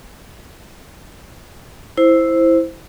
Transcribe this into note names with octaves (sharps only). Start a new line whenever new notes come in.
E4 C5